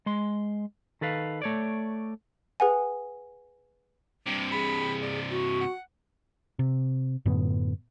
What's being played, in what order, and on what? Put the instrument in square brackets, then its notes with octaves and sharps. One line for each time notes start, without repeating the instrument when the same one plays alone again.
[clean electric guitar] G#3 C6
D#3 A4 B4 F5
A3 C#5 D5
[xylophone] G#4 B4 F#5 G#5
[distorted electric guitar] G2 C3 [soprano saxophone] D6
[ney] G#4 [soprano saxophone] B5
[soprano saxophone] D5
[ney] F#4
[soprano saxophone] F#5
[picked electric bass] C3
F#2 A2 D3 B3